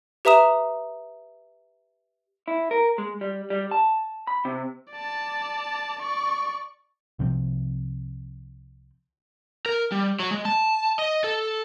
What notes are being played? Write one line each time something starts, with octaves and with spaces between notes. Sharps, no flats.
G4 B4 E5 A#5 D#6 E7
E4
A#4
G#3
G3
G3
A5
B5
C3
D5 A5
D5 C#6
C2 C3 F3 C4
A#4
G3
F#3
G#3
A5
D#5
A4